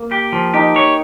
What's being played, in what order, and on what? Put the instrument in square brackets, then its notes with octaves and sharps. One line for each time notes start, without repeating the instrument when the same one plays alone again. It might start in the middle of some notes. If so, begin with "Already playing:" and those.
Already playing: [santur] A#3
[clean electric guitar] G4
F3
[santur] D#4 [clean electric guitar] G4
[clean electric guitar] C#5